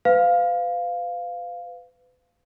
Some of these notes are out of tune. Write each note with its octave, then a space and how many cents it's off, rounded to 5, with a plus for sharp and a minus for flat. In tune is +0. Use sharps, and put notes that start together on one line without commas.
B4 +35 F5 +0